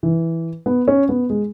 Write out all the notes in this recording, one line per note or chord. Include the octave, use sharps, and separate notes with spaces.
E3
B3
C#4
B3
G#3